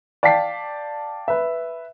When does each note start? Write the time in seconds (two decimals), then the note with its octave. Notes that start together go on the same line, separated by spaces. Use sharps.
0.23 D5 F5 G5 A5 B6 C7
1.28 B4 E5